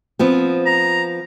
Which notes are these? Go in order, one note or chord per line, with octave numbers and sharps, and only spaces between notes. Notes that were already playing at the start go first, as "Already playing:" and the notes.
F3 B3 C4
A#5